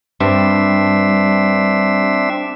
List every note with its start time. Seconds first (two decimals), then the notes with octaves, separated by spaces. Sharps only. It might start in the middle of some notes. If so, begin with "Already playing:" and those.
0.20 G2 C4 D4 E5